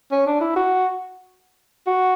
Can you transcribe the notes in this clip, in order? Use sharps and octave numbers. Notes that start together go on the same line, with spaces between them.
C#4
D4
E4
F#4
F#4